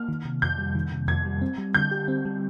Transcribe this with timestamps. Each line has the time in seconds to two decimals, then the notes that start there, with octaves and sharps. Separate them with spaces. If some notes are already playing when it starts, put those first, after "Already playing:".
Already playing: A#3 F6
0.09 D#3
0.25 C3
0.42 F2 G6
0.58 G3
0.75 D#3
0.92 C3
1.08 F2 G#6
1.25 G3
1.41 C4
1.58 G3
1.74 D3 G6
1.91 G4
2.08 C4
2.25 G3